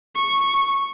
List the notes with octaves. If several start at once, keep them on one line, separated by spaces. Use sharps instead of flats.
C#6